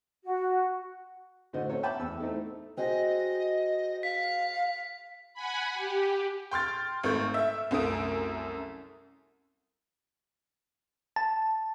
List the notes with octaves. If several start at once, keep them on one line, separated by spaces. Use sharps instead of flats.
F#4
A2 D3 F#4 C5 D#5
C4 C#4 A4 C#5
E5 G5 A5 B5 D6
E2 E6
A3 C4 D#4 E4 A4
C4 F#4 G#4 D#5
F5 B6
F#5 G#5 B5
G4
G5 C6 F6 A6
G#1 A3 C#6 G6
E5
C2 F#2 A3 D#6 D7
A5